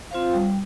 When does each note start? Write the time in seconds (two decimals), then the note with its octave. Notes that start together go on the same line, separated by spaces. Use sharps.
0.11 C4 F4 C5 F5
0.34 G3